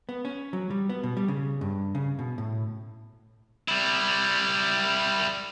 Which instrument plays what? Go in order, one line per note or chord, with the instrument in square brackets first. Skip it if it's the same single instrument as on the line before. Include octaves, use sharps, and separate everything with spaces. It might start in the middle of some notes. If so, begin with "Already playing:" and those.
[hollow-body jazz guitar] B3
C#4
F#3
G3
B3
B2
G3
C#3
G2
C#3
B2
A2
[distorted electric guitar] G3 E4